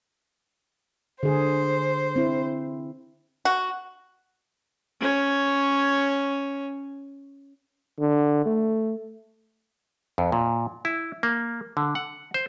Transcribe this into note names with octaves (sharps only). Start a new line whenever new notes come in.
D3 G#4 C5
C4 E4
F#4
C#4 C#5
D3
A3
F2
A#2
E4
A#3
D3
F#5
C5